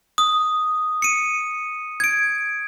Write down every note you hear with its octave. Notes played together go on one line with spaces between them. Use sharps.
D#6
C#7 D#7
G#6 D7